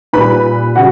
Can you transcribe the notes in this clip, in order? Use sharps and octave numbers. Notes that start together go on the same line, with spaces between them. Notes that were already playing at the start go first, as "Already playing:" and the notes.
A#2 G3 B4 B5
C#3 G3 F#4 F#5